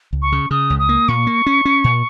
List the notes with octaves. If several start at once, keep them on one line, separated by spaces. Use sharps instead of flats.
C#2
C#6
C#3
C#3 D#6
C#2
D#6
A#3
A#2 C#6
A#3
C#4
C#4
A#2